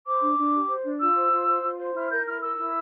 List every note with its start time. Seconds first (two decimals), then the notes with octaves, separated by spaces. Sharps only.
0.06 C5 D6
0.21 D4
0.37 D4
0.53 G4
0.69 C5
0.84 D4
1.00 F4 E6
1.16 C5
1.32 F4
1.47 C5
1.63 F4
1.78 C5
1.94 E4 F6
2.10 A#4 G6
2.26 E4 F6
2.41 A#4 E6
2.57 E4